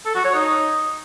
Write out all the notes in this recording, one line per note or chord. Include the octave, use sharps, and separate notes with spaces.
A4
F#4
C#5
D#4